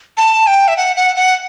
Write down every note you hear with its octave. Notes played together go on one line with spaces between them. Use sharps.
A5
G5
E5
F#5
F#5
F#5